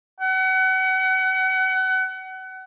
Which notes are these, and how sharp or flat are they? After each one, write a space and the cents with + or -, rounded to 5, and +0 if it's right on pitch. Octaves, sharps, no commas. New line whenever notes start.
F#5 +30